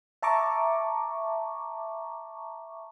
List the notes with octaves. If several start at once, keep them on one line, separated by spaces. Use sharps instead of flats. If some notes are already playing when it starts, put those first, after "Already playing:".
E5 A5 A#5 C#6 D6